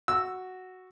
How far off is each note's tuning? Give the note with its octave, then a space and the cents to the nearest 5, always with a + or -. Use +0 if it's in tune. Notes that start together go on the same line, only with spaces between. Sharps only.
F#4 +0 E6 +0